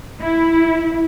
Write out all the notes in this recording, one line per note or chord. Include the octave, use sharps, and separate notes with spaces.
E4